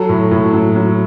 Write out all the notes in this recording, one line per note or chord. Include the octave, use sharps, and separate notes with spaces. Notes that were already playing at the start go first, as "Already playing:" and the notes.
Already playing: F#3 A4
A2
A2
F#3
F#3